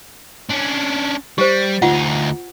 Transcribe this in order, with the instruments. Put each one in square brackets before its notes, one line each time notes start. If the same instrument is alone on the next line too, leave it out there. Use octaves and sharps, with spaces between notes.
[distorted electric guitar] C#4 D4
[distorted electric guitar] G3 [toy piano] G4 C5
[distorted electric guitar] D2 D#4 [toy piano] F4 F#5